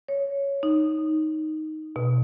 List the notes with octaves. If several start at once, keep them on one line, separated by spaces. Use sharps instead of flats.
C#5
D#4
B2